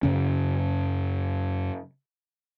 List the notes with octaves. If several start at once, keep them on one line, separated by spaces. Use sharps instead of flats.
F#2 C#3 C#4